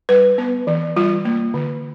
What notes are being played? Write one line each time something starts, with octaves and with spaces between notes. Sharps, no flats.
G3 B4
B3
E3
G3 F4
A#3
D3